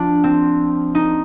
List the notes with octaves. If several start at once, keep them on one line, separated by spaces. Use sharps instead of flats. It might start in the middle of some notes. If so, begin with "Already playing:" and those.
Already playing: F3 D4 F4
C4
D#4